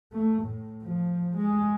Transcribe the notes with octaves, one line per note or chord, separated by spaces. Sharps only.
A3
A2
F3
G#3